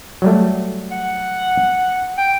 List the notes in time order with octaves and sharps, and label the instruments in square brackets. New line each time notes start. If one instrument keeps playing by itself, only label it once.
[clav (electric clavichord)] F#3 G3 A3
[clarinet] F#5
G5